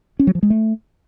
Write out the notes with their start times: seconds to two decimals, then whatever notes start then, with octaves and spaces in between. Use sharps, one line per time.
0.19 C#4
0.27 F#3
0.35 F3
0.43 G#3
0.50 A3